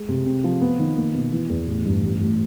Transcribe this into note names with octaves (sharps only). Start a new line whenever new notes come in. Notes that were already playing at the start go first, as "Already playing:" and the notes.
Already playing: G#3
C3
C4
F3
B3
D#3
A#3
B2
E3
E2
A1
G2
A1
A2